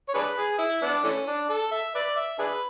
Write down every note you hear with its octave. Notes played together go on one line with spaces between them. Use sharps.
C#5
D4 G#4 B4
G#4
E4
B3 D4
E3 A3 C#4
D4
A4
E5
B4 D5
E5
D4 G#4 B4